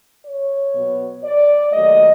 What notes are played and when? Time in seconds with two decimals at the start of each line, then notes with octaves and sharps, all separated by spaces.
0.24 C#5
0.73 B2 F#3 B3
1.23 D5
1.72 D#2 D#3 F#3 A3 D#5